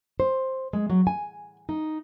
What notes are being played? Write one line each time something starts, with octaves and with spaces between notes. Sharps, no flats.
C5
G#3
F#3
G#5
D#4